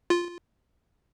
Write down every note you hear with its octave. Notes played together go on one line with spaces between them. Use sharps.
F4